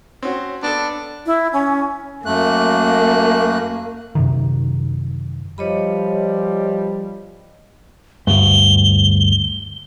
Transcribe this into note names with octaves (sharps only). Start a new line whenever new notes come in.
C4 C#4 F#4
B3 D4 A4
E4
C#4
F#2 A3 A#3 F#6
F#2 C3 D#3
F3 G3 C#5 D#5 B5
D2 G2 G7